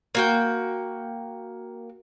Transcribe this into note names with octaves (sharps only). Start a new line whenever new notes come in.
A#3 F#4 G5